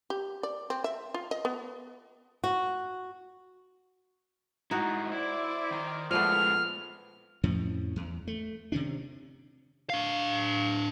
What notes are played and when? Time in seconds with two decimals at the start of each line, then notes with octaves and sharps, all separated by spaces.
0.10 G4
0.43 D5
0.70 C4
0.84 E5
1.14 F4
1.31 D#5
1.45 B3
2.44 F#4
4.71 G#2 D#4 E4 F#4
5.12 E4 C5 D5
5.71 D#3 A#5
6.11 A#2 F3 G#3 A3 B3 F6
7.43 F2 A2 F3 C#4
7.96 E2
8.27 A3
8.72 C3 D#3 C#4 D4
9.90 D4 F5